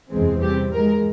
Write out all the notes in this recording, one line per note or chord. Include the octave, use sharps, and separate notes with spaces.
E2 C3 E3 G#3 C4
C3 G3 C4 G4
G#2 E3 G#3 A#4